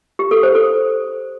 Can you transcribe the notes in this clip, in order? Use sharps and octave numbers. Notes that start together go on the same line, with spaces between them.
G4
A4
C5
A4